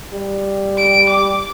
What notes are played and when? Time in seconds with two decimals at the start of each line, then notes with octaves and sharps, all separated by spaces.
0.12 G3
0.77 D7
1.10 D6